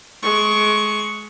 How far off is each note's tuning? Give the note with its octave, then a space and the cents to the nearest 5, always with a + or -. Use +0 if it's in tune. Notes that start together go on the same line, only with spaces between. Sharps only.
G#3 +30 C#6 +0